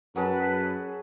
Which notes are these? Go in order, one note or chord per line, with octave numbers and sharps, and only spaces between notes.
F#2 F#3 G#4 B4 A5